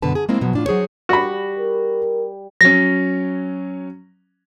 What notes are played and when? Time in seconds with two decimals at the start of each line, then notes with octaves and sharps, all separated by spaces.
0.02 F#2 B2 D3 B4 A5
0.15 G#4
0.29 G#3 A#3 C4 E4
0.41 B2 F3 F#3
0.53 A2 D4 F4
0.66 F#3 G#4 C5 C#5
1.09 G3 F#4 B5
1.59 A#4
2.61 F#3 C#4 A#6